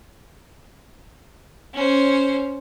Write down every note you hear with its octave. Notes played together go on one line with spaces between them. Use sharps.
C#4 C5